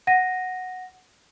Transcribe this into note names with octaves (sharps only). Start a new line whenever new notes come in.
F#5 A#6 D#7